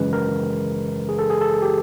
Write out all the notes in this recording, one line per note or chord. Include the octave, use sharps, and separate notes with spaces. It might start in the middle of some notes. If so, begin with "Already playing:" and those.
Already playing: G#1 F#2 C#3 E3 G#3 B4
A#4
G#4
A4
G#4
A4
G4